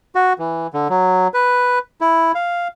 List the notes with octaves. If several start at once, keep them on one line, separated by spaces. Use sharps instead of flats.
F#4
E3
D3
F#3
B4
E4
F5